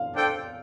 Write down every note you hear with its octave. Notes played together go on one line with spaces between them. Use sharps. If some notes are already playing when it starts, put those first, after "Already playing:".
Already playing: F5
D4 A4 C5 G5